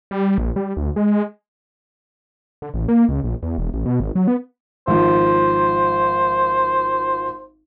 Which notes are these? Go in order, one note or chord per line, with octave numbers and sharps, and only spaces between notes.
G3
A#1
G3
D2
G#3
D3
A1
A#3
C#2
A#1
E2
E1
A1
B2
G#1
F#3
B3
G#1 F3 C5